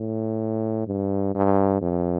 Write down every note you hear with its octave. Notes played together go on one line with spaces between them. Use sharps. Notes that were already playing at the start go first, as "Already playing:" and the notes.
Already playing: A2
G2
G2
F2